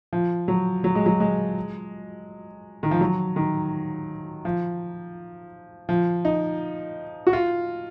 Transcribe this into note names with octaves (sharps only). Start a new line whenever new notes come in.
F3
F#3
F#3
G#3
F#3
G#3
D#3
F3
F#3
D#3
F3
F3
D#4
F#4
F4